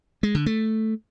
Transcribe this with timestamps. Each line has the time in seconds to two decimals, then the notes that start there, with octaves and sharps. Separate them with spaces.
0.23 G#3
0.35 D3
0.46 A3